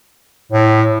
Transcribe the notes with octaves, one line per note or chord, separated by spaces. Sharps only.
A2